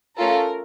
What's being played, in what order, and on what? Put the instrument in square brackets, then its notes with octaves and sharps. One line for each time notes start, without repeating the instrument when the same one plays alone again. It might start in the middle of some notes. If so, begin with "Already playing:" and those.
[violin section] A3 C#4 F4 A4 A#4